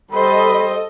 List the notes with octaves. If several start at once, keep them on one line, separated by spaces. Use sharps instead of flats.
G3 A4 C5 D#5 B5